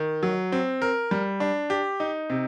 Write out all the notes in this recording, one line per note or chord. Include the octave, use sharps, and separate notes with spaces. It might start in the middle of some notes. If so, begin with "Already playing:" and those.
Already playing: D#3
F#3
C4
A#4
G3
D4
G4
D#4
C3